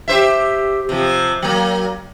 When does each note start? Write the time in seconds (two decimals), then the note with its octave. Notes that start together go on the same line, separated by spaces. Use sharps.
0.08 G4 C5 E5
0.89 C3 F3
1.42 F#3 A#3